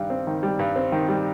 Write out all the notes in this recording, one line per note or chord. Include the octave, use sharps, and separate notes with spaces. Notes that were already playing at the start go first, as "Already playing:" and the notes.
Already playing: G2 D#3 G3
C4
D#3
G3
G2
C4
D#3
G3